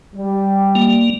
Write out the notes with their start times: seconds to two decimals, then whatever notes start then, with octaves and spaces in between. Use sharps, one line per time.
0.15 G3
0.75 A#3